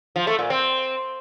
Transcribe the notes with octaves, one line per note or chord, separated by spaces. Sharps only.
F3
A3
A#2
C4